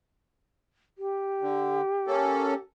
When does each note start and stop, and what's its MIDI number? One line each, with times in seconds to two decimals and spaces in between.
0.98 2.57 67
1.41 1.82 50
2.07 2.54 58
2.07 2.54 61
2.07 2.54 69